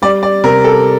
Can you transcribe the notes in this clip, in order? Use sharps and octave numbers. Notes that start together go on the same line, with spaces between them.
G3 D5
D5
C3 A#4
A4